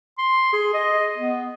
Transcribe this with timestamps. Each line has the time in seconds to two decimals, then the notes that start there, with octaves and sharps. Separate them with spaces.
0.18 C6
0.53 G#4
0.74 D#5
1.18 B3